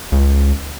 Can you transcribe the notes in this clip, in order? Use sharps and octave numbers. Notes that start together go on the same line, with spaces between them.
C#2